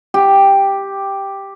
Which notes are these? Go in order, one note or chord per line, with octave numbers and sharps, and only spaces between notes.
G4